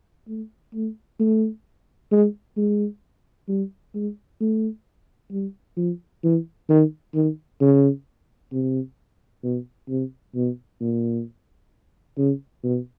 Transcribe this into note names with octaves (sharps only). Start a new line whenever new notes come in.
A3
A3
A3
G#3
G#3
G3
G#3
A3
G3
F3
E3
D#3
D#3
C#3
C3
B2
C3
B2
A#2
C#3
B2